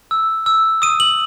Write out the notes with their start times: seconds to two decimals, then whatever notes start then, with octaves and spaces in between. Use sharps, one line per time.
0.11 E6
0.46 E6
0.82 D#6 D#7
1.00 F#7